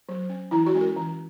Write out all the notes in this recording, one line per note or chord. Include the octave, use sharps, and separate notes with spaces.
F#3
C#4
E3 E4
F#4
G#3 C#4
A#4
E3